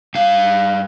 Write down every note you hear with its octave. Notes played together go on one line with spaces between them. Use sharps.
G2 F5